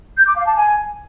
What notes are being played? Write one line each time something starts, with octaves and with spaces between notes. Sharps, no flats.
G6
D6
F5
A5
G#5